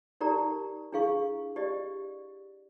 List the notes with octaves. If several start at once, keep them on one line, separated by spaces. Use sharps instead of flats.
D#4 G4 A#4 D5 A#5
D4 E4 G#4 F5 C#6
G4 D5 D#5